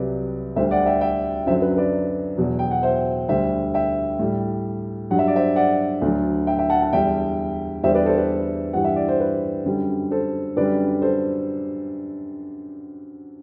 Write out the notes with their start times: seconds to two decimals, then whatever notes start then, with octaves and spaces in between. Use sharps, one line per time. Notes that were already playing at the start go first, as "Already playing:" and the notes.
Already playing: C2 C3 F#3 B4 D5
0.56 D2 D3 G3 C5 E5
0.71 D5 F#5
0.86 E5 G5
1.01 E5 G5
1.46 F#2 D3 F#3 C5 E5
1.62 B4
1.77 B4 D5
2.37 E2 B2 F#3
2.59 G5
2.71 F#5
2.83 C5 E5
3.28 D2 D3 G3 C5 E5
3.74 E5 G5
4.19 A2 G3
5.10 G2 F#3 F#5
5.19 E5
5.28 D5
5.36 C5 E5
5.56 D5 F#5
6.02 D2 D3 F#3
6.47 E5 G5
6.59 E5 G5
6.70 F#5 A5
6.82 F#5 A5
6.93 E2 D3 G3 E5 G5
7.83 E2 D3 G3 C5 E5
7.95 B4 D5
8.06 A4 C5
8.18 B4
8.73 G2 E3 G3 F#5
8.85 E5
8.96 D5
9.08 C5
9.20 B4
9.66 F#2 D3 G3
10.11 A4 C5
10.56 F#2 D3 G3 B4 D5
11.02 A4 C5